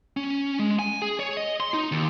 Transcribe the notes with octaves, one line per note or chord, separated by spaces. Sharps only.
C#4
G#3
G#5
G#4
C#5
D#5
C6
D#4
D#2